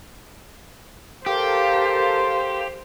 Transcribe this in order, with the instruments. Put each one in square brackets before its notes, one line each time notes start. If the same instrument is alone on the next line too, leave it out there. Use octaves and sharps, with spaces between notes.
[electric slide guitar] G4 [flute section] A4 A#4 F5 [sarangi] C5